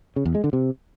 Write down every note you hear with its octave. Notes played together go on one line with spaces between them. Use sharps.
C#3
E2
G#3
D3
C3